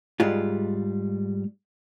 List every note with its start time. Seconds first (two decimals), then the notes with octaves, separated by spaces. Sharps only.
0.20 G#2 G3 G#3 F4